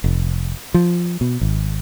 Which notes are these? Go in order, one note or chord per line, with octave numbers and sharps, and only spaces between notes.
F1
F3
B2
G#1